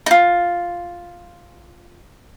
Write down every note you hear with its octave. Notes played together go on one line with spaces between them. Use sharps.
D#4 F4